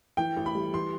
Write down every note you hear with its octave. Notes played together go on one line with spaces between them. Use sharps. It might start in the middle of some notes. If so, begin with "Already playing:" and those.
E3 G5
A1
B5
G3
E3 C6